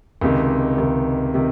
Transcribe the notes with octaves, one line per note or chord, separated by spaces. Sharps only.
C#2 C3 D#3
C#2 C3 D#3
C3 D#3